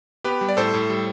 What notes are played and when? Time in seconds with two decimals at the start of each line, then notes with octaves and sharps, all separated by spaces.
0.24 B3 G4 B4
0.41 G3
0.49 D5
0.57 A2 A4 C5
0.74 A2
0.90 G3